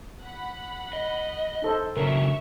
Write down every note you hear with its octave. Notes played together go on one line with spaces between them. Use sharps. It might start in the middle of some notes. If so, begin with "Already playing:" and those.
F#5 B5
D#5
D#4 A4 C5
C#3 F#3 D4 A#4 E5 C#6